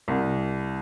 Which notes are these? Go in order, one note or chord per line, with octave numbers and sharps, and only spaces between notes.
C2